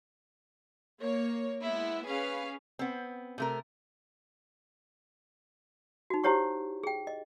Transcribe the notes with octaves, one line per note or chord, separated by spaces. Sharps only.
A#3 C#5
G#3 B3 E4
C#4 G#4 B4 F5
B3 C4
C3 A3 A#4
D#4 F#4
E4 G4 C5 C#5 F#5 C#6
G#4 G5
D#5